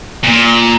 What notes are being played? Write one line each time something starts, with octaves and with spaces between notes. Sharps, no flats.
A#2